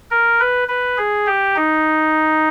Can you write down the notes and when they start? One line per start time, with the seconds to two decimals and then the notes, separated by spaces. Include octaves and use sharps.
0.11 A#4
0.40 B4
0.68 B4
0.98 G#4
1.26 G4
1.56 D#4